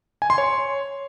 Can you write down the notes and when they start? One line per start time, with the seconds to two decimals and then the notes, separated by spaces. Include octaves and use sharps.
0.22 G#5
0.30 C6
0.38 C#5